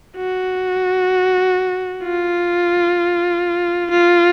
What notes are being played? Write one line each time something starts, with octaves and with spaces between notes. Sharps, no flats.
F#4
F4
F4